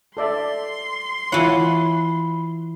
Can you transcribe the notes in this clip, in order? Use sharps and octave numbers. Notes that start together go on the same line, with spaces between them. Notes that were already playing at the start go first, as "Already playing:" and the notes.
A4 D5 E5 C6
E3 E4 F4 C#5 F#5 B5